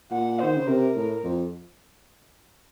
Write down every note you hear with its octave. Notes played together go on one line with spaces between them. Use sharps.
A#2 F#5
D#3 C5
C#3
C3 A#4
A2
F2